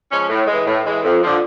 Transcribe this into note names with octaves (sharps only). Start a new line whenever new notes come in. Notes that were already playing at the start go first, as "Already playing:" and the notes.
F3 G#3 C#4
A2
E3 G#3
A2
E3 G#3
F2
D3 F3